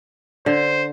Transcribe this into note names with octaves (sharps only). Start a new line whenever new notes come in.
D3 C5